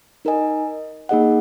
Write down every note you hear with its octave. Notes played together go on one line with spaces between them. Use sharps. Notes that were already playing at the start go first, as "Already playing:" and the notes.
D#4 A#4 D#5 G#5
A#3 D#4 G#4 D#5 F#5